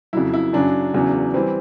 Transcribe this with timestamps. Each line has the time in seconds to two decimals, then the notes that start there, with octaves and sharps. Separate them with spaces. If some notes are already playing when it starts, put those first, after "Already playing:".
0.13 F2 C#3 F#3 E4
0.34 E4
0.53 F#2 C#3 F#3 D4
0.94 E2 C#3 F#3
1.34 E3 G3 C4